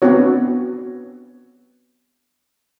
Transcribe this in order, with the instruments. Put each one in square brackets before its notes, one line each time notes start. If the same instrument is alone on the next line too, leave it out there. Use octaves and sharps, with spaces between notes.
[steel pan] B3 C4 D4 F#4 C#5